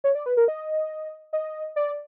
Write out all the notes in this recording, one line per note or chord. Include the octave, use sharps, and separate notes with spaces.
C#5
D5
B4
A#4
D#5
D#5
D5